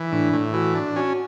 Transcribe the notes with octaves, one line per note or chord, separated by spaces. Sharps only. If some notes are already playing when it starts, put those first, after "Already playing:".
Already playing: E3
A2 D4
A2
E3 F#4
D4
C#4 F#4